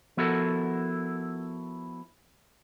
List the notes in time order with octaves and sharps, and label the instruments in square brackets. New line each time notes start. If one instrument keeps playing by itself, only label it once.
[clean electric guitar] F3 B3 E4 F#4 A4 A#4